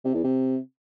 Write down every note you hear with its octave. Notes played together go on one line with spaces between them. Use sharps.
C3
E2
C3